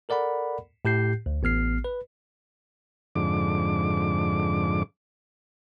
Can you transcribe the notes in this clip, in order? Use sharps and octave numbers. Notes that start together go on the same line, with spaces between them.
A4 A#4 D5 F#5 B5
A2 G4 G6 C7
D2
A1 B3 F6 C7
B4
F2 G#2 D3 D6